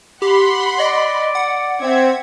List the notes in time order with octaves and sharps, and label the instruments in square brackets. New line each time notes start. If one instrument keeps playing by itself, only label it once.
[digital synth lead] G4 [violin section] F#5 B5 C6
[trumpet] D5 [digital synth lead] D#5
[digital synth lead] F#5
[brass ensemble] C4 [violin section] E5 G#6